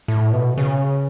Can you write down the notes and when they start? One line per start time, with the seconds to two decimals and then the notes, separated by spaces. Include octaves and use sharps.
0.08 A2
0.32 B2
0.58 C#3